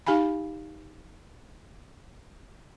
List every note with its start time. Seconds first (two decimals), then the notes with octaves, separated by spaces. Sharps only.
0.07 D#4 G4 F5 G#5 B5